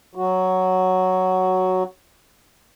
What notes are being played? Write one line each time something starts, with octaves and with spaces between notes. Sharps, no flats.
F#3 F#4